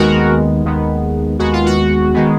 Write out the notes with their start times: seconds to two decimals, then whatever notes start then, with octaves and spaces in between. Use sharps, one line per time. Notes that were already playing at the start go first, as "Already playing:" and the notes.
Already playing: D#2 D#3 G#3 B3 F#4 A#4
0.65 D#2 D#3 G#3 B3
1.39 D#2 D#3 G#3 B3 F#4
1.53 F4
1.66 F#4
2.14 D#3 G#3 B3